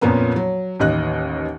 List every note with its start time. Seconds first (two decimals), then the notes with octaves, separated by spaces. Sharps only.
0.01 F2 A#2 F3 A#3 B3 C#4
0.36 F#3
0.80 A1 D#2 D#5 F#6